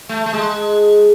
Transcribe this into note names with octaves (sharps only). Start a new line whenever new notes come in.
A3
A3
G#3